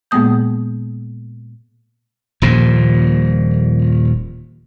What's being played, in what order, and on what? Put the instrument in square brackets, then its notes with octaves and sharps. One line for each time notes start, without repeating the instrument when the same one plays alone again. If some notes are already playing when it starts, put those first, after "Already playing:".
[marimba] A#2 G#3 A#3 B3 D#6 G6
[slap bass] D#1 A#2 F3